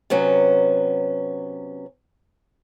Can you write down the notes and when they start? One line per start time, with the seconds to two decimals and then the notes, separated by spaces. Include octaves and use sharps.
0.10 C3 F#3 B3 C#4